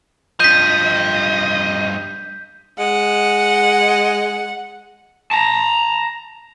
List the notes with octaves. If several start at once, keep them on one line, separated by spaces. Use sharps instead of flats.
G2 F3 D#5 G6 B6
G#3 F#5
A5 A#5